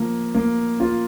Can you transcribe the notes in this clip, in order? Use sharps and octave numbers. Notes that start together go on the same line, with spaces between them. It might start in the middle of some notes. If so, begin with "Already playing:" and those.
Already playing: F3 A#3
A#3
F4